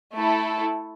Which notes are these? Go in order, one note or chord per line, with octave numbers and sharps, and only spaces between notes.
A3 E4 A4